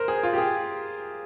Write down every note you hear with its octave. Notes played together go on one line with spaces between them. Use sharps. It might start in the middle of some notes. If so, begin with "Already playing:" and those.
Already playing: A#4 C5
G#4
F4
G4
G#4